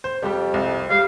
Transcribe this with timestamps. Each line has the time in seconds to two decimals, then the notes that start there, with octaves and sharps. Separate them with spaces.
0.04 C5
0.22 F2 G3 G4
0.54 C2
0.90 G3 F5